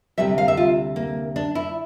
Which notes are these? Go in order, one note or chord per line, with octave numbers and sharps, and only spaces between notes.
D2 C3 G3 E5
F5
E5
F4
A#3
D4
E4